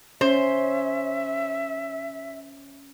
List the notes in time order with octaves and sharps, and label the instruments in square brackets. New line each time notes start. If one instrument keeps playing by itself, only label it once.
[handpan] C#4 [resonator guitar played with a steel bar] C5 [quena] E5